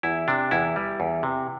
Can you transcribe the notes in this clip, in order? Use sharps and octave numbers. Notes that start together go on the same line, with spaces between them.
E2 E4
C3 D4
E2 E4
G3
E2
C3